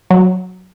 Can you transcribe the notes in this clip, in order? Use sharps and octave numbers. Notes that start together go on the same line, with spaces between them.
F#3